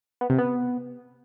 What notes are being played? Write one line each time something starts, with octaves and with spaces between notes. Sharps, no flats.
B3
C3
B3